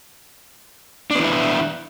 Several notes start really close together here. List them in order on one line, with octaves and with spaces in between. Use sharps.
D4 B3 E3 E4